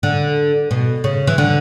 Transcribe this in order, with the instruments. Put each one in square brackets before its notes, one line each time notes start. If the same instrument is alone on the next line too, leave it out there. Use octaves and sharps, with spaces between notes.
[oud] D3
B2
C#3
E3
D3